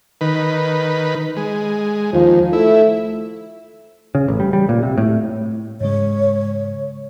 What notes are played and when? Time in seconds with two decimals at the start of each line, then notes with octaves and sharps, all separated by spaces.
0.21 D#3 B4
1.37 G#3
2.13 D#2 F3
2.53 A3 E4
4.15 C#3
4.28 A1
4.40 G3
4.53 G3
4.69 A#2
4.83 C3
4.98 A2
5.81 G#2 C#3 G#3 C#5